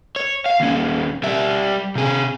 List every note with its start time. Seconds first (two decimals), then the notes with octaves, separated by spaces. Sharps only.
0.16 C#5
0.46 F5
0.60 D#2 C#4
1.24 G3 E5
1.95 C3 G#4